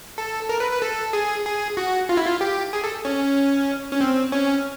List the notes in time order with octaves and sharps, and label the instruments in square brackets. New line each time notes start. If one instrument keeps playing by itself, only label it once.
[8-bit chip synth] A4
A#4
B4
B4
A4
G#4
G#4
F#4
F4
E4
F4
G4
G#4
A4
C#4
C#4
C4
C#4